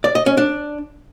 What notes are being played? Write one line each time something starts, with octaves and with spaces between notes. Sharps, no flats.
D5
D#5
C#4
D4